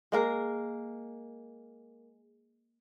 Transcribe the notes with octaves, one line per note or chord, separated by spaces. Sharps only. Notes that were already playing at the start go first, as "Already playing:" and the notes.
G#3 A#3 A#4